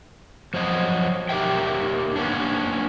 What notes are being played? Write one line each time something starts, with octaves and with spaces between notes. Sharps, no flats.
F3 F#3 C5 D#5
D#4 G4 A#4 E5 G5
A#3 B3 C#4 D4